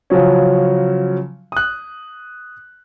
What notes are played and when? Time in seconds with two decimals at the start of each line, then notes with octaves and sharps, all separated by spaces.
0.10 C#3 F3 F#3 C#4
1.52 D#6 F#6